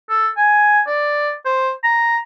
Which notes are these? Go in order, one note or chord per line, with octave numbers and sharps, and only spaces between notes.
A4
G#5
D5
C5
A#5